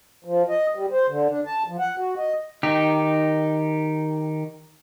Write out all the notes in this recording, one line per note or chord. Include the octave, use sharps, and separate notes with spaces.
F3
D#5
G3
C5
D3
D4
A5
F3
F#5
F#4
D#5
D#3 D#4 G4